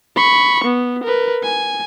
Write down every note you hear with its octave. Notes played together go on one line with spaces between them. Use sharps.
B5 C#6
B3
A#4 B4
G#5